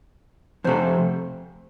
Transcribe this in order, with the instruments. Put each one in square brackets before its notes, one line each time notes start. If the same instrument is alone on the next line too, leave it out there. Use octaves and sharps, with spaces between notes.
[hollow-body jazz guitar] F2 C3 A3 C5